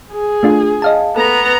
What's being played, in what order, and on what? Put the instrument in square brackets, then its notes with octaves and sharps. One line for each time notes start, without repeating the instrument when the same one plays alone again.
[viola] G#4
[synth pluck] A3 D4 F4
D#5 F5 A5
[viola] B3 A#5 [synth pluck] A4